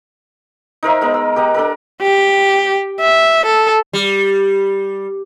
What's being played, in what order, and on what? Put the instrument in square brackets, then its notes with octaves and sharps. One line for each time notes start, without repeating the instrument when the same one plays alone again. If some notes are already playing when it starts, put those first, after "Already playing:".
[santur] D#4 A#4 C5 E5
G#3 B3 A#4 D#5
E6
G4 A#4 D#5 F#5
D4 A4 A#4
[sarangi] G4
E5
A4
[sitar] G3